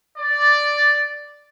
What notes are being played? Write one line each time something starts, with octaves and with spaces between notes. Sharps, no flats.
D5